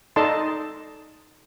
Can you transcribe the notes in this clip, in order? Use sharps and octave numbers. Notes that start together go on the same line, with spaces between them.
D#4 A4 D5 D#5 A5 C6